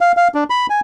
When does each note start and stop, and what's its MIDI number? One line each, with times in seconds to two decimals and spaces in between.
0.01 0.12 77
0.17 0.28 77
0.35 0.44 62
0.50 0.67 83
0.70 0.80 80